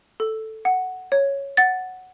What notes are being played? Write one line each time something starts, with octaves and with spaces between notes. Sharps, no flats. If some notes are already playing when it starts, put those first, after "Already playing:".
A4
F#5
C#5
F#5 A6